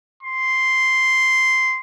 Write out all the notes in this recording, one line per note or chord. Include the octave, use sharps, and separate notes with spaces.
C6